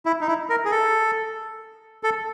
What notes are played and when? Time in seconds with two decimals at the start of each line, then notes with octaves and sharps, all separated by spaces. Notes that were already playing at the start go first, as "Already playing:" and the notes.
0.06 E4
0.21 D#4
0.27 E4
0.49 A#4
0.65 G#4
0.72 A4
2.03 A4